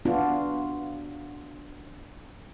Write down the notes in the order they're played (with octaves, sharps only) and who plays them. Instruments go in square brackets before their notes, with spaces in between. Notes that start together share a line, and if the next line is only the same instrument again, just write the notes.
[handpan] B3 D4 F4 F#4